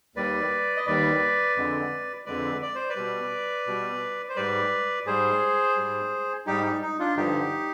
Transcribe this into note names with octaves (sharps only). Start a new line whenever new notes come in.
D#2 D#3 G3 B4 D5
D#5
D#2 D#3 G3 B4 D5
F2 D3 G#3
F2 D3 G#3 B4 D5
D5
C5
B4 D5
B2 G3
B2 G3
C5
G#2 G3 B4 D5
G#2 G3 G#4 C5
G#2 G3
G#2 G3 D#4 G4
D#4
D#4
D4 F4
G2 D3 F3 D#4 G4